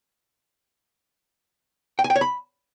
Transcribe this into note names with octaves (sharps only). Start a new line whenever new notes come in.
G5
G#5
G5
C#5
B5